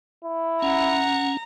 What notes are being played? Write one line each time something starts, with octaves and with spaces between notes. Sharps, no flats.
E4
C#4 F#5 A#5